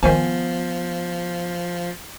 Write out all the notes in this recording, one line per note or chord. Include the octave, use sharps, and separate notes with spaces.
D#3 F3 B3 C5 G#5